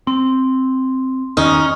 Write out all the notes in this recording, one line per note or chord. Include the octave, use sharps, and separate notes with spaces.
C4 C6
E2 G2 D#3 C#4 D#4 C#6 D#6 F6